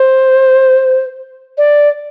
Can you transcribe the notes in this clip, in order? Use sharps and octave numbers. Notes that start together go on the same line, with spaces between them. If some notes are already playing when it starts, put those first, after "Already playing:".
Already playing: C5
D5